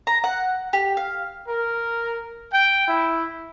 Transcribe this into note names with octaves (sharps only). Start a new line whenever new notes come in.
A#5
F#5
G4
F5
A#4
G5
E4